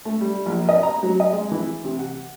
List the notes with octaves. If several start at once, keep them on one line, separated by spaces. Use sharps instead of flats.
A3
G3
A#1
D#5
A#5
F#3
D#5
G#3
E3
C3
F#5